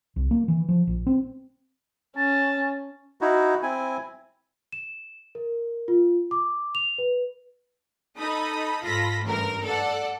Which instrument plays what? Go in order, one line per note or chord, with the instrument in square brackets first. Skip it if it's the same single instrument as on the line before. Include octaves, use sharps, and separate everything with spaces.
[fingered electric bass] C2
A#3
E3
F3
A#1
C4
[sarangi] C#4 [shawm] A5
[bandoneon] D#4 E4 F#4
C4 E4 G#5
[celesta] E7
A#4
F4
D6
F7
B4
[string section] D#4 A4 B5 D#6
G#2 F4 A4 B5 A#6 B6
A1 G2 A#4
A4 D5 F#5